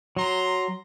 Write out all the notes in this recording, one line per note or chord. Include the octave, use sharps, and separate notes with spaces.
F#3 A#5 C6